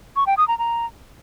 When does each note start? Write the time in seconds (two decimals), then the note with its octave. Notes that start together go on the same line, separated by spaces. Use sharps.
0.16 C#6
0.27 G5
0.37 D#6
0.48 A#5
0.59 A#5